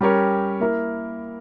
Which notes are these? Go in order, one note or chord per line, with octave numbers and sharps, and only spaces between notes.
G3 C#4 G4 A#4 C#5
A#3 E4 A#4